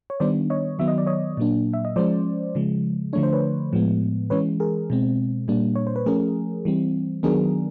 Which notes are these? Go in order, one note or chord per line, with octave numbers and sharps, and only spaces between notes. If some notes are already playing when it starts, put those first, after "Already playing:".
C#5
D#3 G3 B3 D4 C5 D5
C#5 D#5
D#3 F#3 B3 E5
D#5
D5
C#5 D#5
A#2 F#3 A#3 D4
E5
D#5
F3 G#3 C#4 C5 D5
C#3 F3 G#3
D3 F3 A3 D4 C#5
C5
B4 C#5
A2 F3 G#3 B3
E3 G#3 C#4 B4 C#5
G#4 A#4
B2 G#3 C4
A#2 G3 A#3 D4
C#5
C5
B4
F3 A3 C#4 G#4 A#4
E3 G3 C4
D#3 F#3 B3 D4 G#4 A#4